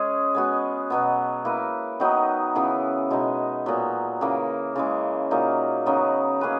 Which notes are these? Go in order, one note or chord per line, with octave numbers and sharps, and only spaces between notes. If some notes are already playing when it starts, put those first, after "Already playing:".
Already playing: G#3 C#4 G#4
G#3 B3 F#4
B2 F#3 B3
A#3 E4 B4
D#3 F#3 B3 D#4
C#3 E3 B3 E4
B2 G#3 D#4
A#2 F#3 B3
C#3 E3 A#3
C#3 E3 G#3
A#2 F#3 A#3 D#4
C#3 F#3 B3 D#4
A#3 C#4 G#4 B4